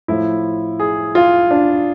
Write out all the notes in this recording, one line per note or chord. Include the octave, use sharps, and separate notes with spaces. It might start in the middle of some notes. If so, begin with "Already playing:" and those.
A2 F3 E4
G#4
F4
D4